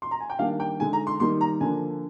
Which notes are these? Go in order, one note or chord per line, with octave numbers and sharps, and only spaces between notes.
C6
A#5
G#5
G5
D#3 G3 A#3 D4 F5
G5
D3 G#3 D#4 G#5
A#5
C6
D#3 G3 A#3 D#4 C6
A#5
D3 F3 A#3 D4 G#5